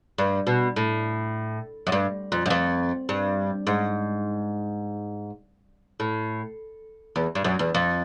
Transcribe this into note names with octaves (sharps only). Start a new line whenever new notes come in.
G2
B2
A2
F#2
G2
F2
F#2
F2
G2
G#2
A2
E2
G2
F#2
E2
F2